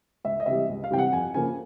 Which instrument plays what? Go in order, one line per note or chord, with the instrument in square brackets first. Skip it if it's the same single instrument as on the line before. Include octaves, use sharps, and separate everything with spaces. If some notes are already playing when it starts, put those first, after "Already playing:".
[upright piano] C#2 E5
D#5
C3 E3 G3 E5
C#2
F5
C3 E3 G3 G5
F#5
F2 G#5
C#3 F3 A#3 G#5